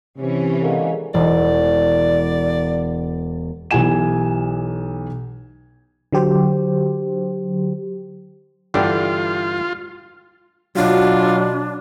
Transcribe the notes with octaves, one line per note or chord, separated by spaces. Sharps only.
C3 E3 C#4
D3 G#3 A#3
E1 D5
B1 E3 G4 G#5 E7
D3 F#3 G4 C5
G2 D3 E3 F4 G4 D5
B2 F#3 D4 F4